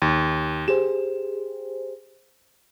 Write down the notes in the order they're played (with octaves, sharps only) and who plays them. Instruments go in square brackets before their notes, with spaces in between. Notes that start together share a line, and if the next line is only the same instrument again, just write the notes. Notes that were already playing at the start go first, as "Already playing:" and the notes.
[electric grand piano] D#2
[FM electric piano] G4 G#4 C5 [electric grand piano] E7